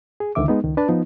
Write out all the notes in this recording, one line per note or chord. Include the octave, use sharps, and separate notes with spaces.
G#4
C#2 D3 D#3 E5 D6
G#3 B3 D#4
C#2 D#3
D4 B4 A5
F3 B3 D#4